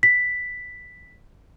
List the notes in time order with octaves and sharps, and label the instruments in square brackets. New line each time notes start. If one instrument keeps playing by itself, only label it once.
[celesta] B6